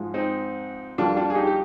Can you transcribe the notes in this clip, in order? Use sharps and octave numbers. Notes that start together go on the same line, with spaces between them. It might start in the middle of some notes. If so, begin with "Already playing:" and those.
Already playing: G#2 F3 G#3
C4 D#4
F2 D3 G3 A#3 D4 F4
D4 F4
G#4
D#4 G4
G4